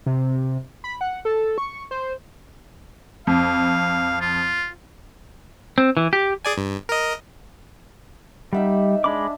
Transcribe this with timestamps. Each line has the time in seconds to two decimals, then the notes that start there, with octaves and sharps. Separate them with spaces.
0.06 C3
0.84 B5
1.01 F#5
1.25 A4
1.58 C#6
1.91 C5
3.27 F2 F5
4.21 F4
5.78 C4
5.97 E3
6.13 G4
6.45 G#4 D5 G#5
6.57 G2
6.89 A#4 D#5
8.53 G3 D#4 E5 F#5
9.04 G#3 D4 B5 D6